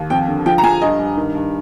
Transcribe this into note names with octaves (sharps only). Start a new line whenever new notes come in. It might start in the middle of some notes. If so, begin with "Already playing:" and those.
Already playing: D#2
F2 G5
D3
F3 G5
A#5
F3 G#5
G2 D#5
G2
D#3
G2